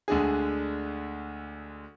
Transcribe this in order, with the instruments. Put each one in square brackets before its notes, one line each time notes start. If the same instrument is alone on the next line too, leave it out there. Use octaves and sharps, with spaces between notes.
[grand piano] D2 D3 G#3 D4 G#4